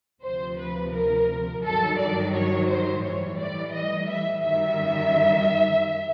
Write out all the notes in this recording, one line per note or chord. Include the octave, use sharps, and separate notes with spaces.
D2 C3 F3 C5
B4
A#4
G2 D#3 F#3 A4
D5
C#5
C5
A2 E3 G3 C#5
D5
D#5
E5
F#2 D#3 G3 E5